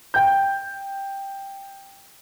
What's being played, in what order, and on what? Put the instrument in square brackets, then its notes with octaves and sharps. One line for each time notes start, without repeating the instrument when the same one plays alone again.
[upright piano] G5 G6